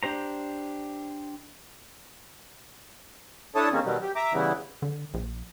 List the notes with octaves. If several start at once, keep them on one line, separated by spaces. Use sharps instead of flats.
D4 G4 C5 A#5
D4 E4 A4 C#5 A5 D#6
D#3 G#3 A#3 C4 C#4
B2 D#3 F#3 G3
G4
E5 A#5 D6
C#3 E3 G3 B3 E4
D3
A#1